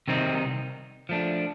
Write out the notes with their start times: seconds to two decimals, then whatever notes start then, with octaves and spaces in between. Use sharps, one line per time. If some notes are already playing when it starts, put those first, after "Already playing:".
0.08 C3 D#3 G3 C4 D#4
1.09 F3 A3 D4